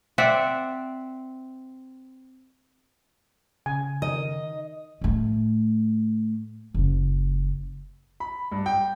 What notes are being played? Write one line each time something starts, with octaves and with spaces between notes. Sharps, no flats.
C4 D5 E5 F#5
C#3 G#5
D#3 D#5
A2 A3
F#1
B5
G2
G5